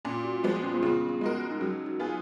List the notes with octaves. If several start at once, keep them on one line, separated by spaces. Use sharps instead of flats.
A#2 C#4
F#4
F3 G#3 B3 F4
C#4
B3
C#3 C#4
B3
G#3 D#4 F#4 A#4
D#4
F#3 C#4
D#4
B3 F4 G#4